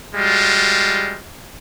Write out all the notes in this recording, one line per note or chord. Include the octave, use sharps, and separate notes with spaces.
G3 G#3 F4 F#4